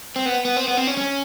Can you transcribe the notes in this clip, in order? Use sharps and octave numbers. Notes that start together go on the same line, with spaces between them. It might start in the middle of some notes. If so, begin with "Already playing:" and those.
C4
B3
B3
C4
B3
C4
C#4
C#4